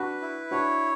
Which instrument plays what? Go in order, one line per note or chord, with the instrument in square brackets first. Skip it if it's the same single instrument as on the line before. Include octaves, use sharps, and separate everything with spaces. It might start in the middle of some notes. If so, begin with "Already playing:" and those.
Already playing: [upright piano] D4 F#4 [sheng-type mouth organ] B4
[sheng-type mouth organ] E4
[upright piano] D4 F#4 [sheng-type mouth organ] C#5